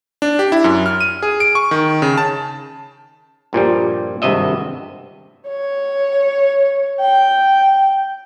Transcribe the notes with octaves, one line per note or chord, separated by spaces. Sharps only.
D4
G4
E4
F#2
F6
D#7
G#4
D7
C#6
D#3
C#3
A5
G2 A#2 F3 G3
G#1 G2 C3 D#5 E5
C#5
G5